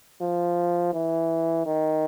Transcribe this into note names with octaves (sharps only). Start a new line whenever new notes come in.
F3
E3
D#3